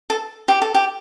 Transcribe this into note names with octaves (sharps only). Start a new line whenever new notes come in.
A4
G4
A4
G4